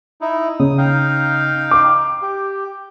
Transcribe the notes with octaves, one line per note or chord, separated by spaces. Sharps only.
D#4 E4
C#3 D#6
D#4 F5 G5
D6
G4